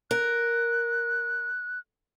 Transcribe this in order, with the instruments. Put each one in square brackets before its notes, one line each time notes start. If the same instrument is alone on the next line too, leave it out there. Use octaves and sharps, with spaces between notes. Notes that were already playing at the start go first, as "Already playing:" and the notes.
[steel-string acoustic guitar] A#4 [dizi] F#6